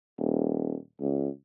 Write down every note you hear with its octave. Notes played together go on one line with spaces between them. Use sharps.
D#1
C#2